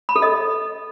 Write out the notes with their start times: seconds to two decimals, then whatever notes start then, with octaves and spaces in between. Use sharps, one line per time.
0.09 B5
0.16 A4
0.22 D#5